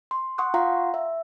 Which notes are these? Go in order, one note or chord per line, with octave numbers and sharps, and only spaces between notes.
C6
F#5 C6 C#6 D#6 F#6
F4 F5 F#5 A#5 C6
E5